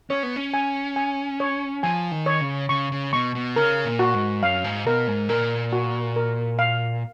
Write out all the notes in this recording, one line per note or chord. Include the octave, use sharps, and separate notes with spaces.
C#4 C#5
B3
C#4
G#5
G#5
C#5
F3 G#5
D#3
C#5
C#3
C#3 C#6
C#3
B2 C#6
B2
C#3 A#4
A#2
F#4
G#2
F#2 F5
G#2
B2 A#4
G#2
A#2 A#4
F#4
A#4
F5